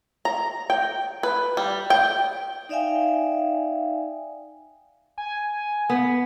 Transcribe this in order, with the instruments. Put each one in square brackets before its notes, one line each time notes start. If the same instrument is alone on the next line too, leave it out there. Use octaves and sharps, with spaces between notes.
[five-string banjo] A#5
G5
B4
G3
G5
[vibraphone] D#4 D5 E5 F5 G5 G#5
[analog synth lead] G#5
[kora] B3